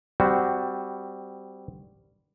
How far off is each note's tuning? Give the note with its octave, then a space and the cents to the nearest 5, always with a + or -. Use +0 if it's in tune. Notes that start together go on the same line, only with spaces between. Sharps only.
G3 +0 C4 -15 F#4 +0